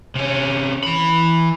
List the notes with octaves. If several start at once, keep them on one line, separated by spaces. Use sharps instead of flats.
C3 C#4
E3 B5